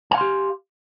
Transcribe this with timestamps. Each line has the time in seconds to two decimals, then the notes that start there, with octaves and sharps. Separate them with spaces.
0.11 G#5
0.14 F5
0.18 C6
0.21 G4